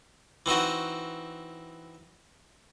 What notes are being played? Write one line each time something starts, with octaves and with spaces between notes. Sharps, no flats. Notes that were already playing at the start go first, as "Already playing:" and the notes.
E3 C4 D#4 F#4